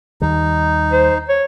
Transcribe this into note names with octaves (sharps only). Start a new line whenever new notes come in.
D#2 D#3 G3 D#4
C5
C#5